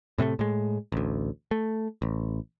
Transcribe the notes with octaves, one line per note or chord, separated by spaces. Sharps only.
A2 C3 G#3 A3
A2 G#3
A1 D2
A3
A1